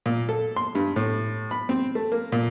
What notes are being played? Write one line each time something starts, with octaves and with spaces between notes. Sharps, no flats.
A#2
A4
C6
G2
A2
B5
C4
A3
A#3
A#2